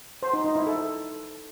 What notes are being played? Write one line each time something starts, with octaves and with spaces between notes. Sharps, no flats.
C5
D#4
D#4
E4
A4